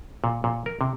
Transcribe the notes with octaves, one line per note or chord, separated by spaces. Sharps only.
A#2
A#2
A#4
C3